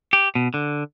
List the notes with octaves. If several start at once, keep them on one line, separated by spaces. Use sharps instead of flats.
G4
B2
D3